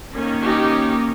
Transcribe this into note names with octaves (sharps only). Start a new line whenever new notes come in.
D#3 A#3 C#4
D#4 G4